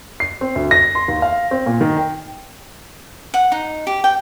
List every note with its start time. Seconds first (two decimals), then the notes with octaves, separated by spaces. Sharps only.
0.20 C7
0.41 C4
0.56 D2
0.71 A#6
0.95 C6
1.08 D#2
1.22 F5
1.51 C4
1.66 A#2
1.81 D#3
1.97 G5
3.34 F#5
3.52 D#4
3.87 G4
4.04 G5